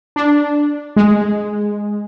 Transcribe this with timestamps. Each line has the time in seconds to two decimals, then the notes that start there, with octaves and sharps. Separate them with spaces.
0.16 D4
0.96 G#3